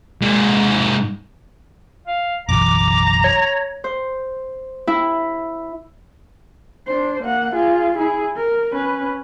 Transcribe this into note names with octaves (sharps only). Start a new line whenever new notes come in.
G#2 A#3
F5
F#1 B1 E3 A#5 D6
C#5
C5
E4
D4 C5
A#3 F#5
F4 G#4
E4 G#4
A#4
C#4 B4